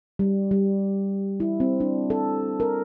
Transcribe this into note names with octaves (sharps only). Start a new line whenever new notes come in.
G3
G3
E4
C4
D4
A4
A#4